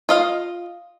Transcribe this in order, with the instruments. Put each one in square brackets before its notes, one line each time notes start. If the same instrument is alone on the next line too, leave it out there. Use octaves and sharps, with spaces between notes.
[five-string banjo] F4 D#5 F5